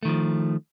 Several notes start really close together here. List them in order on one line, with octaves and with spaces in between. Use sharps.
A3 D#3 F3